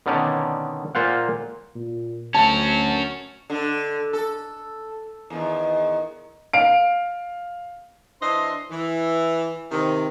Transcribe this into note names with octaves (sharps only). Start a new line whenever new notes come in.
B2 D3 D#3 C#4 D5
A#2 A#3 F4 C5 F5 F#5
A#2
D2 C#4 F#4 A5
D3
A4
E2 D#3
F5 D7
E3 D4 C5 D#5 C6
E3
C3 D#3